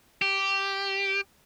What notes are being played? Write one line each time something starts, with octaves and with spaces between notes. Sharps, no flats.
G4